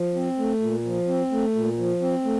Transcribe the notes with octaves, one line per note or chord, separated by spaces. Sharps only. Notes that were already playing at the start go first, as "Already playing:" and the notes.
Already playing: F3
C4
A3
A#2
F3
C4
A3
A#2
F3
C4
A3